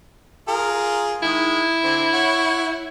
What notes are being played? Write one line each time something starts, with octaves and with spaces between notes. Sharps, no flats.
F4 G#4 A#4
D#3 G#3 E4
D3 C4
C#5 F#5